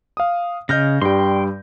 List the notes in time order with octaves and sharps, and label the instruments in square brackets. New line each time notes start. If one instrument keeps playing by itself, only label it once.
[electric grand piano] F5 D#6
[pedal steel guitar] C#3 F6 [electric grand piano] D#5 G6 A#6
[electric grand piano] G2 G3 [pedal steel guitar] G5 C6